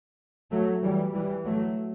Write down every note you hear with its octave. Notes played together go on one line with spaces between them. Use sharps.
F#3 A3
E3 G3
E3 G3
F#3 A3